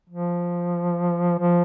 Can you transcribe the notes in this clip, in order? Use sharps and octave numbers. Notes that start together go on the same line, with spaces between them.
F3
F3